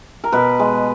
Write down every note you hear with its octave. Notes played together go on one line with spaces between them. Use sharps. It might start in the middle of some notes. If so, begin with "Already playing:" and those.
A#4
B2 B4
G#3